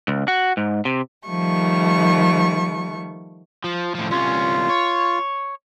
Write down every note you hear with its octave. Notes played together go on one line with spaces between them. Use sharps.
C#2
F#4
G#2
C3
D#3 F3 G3 A3 C#6
F3
A2 F3
C2 C#4 F4
C#5